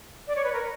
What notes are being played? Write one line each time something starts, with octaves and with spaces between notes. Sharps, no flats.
D5
C#5
B4
A#4